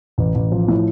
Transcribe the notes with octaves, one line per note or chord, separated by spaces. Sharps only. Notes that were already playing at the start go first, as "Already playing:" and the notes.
A1
A1
F3
A2